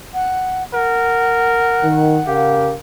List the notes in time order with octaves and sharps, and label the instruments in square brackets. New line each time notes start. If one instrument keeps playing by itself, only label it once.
[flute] F#5
[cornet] A#4 [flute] F#5
[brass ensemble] D#3
[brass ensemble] C#3 A#4 F5 [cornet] G4